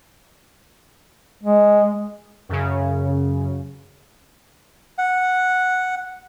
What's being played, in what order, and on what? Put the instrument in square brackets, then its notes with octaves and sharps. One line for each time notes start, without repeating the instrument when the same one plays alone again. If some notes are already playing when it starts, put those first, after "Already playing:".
[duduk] G#3
[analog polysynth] F#2 C#3
[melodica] F#5